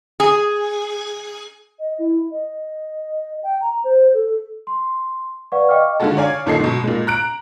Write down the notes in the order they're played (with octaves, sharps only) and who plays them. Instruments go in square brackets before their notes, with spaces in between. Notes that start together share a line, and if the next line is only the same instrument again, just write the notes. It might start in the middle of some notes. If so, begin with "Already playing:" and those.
[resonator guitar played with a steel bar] G#4
[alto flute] D#5
E4
D#5
G5
A#5
C5
A4
[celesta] C6
B4 D5 F5 F#5 C#6
D#5 F5 G5 C#6 D6 F6
[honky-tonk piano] D3 D#3 G#3 F4 F#4 A4
C#5 D5 F5 G#5
F#1 A#2 D#3 A4 D#5 C7
G#2 B2
A#2 G#3
A#5 F#6 D7